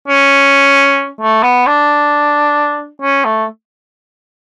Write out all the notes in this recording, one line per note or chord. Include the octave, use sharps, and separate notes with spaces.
C#4
A3
B3
D4
C#4
A3